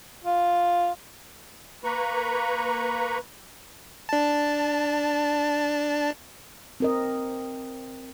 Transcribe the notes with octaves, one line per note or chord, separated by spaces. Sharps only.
F4
A#3 B4 A#5 B5 C#6
D4 A5
C4 A#4 D#5